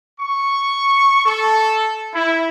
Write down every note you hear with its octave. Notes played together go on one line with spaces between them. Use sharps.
C#6
A4
E4